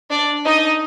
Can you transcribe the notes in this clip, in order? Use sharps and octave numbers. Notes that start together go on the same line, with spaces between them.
D4 D5
D#4 D#5